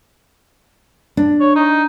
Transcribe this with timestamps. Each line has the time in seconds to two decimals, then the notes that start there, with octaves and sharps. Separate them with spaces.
1.17 D4
1.40 C#5
1.56 D#4